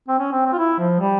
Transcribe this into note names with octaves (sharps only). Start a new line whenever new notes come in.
C4
C#4
C4
C4
F4
E4
F3
G3